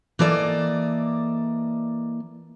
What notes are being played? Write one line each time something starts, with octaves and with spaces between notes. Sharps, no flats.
E3 A#3 A4 D5 D#5